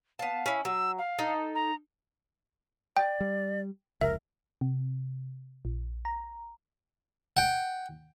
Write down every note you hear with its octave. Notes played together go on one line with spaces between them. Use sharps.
B3 F5 A5
C#4 E4
F#3 E6
F5
D#4 A4
A#5
D5 G5
G3
F1 C#2 A#4 E5
C3
A#1
A#5
F#5 G5